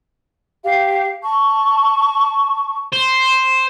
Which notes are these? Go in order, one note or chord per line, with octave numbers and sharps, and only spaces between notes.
G4 F5
A5 C#6
C5